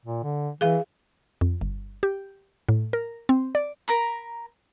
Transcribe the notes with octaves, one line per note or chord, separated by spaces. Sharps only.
A#2
D3
E3 G#4 F5
F2
G1
G4
A2
A#4
C4
D5
A#4 A#5 B5